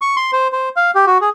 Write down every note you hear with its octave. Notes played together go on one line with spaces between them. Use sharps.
C#6
C6
C5
C5
F5
G4
F#4
G#4